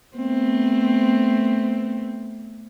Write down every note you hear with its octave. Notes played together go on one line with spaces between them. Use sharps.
A3 B3 C4